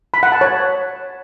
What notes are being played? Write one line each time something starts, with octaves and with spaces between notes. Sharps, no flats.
B5
F#5
A5
C#5